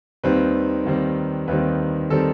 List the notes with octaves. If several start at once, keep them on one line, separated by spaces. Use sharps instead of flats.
D#2 D#3 G3 C4 B4
D#2 D#3 G3 C4
D#2 D#3 G3 C4 B4
D#3 G3 C4 A4